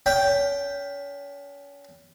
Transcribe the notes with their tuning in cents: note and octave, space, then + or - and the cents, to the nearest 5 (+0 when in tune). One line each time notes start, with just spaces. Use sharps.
C#4 +35 G5 +0